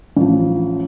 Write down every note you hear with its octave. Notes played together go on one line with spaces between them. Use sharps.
A1 F3